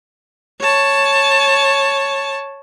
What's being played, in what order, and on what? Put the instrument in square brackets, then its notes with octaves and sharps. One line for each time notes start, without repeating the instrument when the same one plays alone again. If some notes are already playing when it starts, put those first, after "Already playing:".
[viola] C#5 A5